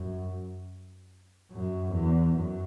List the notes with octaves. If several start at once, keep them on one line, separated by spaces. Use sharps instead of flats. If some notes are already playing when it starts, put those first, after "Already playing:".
Already playing: F#2
F#2
E2
F#2